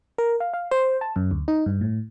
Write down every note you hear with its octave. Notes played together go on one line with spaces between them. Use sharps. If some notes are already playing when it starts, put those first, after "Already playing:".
A#4
F5
F5
C5
A5
F#2
D2
D#4
G2
A2